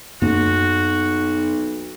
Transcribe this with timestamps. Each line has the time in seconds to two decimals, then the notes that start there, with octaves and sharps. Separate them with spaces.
0.22 B1 F#2 A#3 F#4